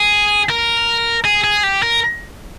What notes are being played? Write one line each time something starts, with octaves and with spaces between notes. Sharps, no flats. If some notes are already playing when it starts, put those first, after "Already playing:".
Already playing: G#4
A#4
G#4
G#4
G4
A#4